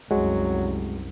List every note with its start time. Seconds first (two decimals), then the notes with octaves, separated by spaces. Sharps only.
0.11 C2 F#2 F#3 G#3 F#4